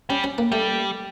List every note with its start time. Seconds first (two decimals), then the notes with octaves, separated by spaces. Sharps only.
0.09 G3 C#4
0.24 C#4
0.38 A#3
0.52 G3 A3